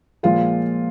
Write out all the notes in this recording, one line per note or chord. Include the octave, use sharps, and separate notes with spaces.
A#2 F3 G#3 F4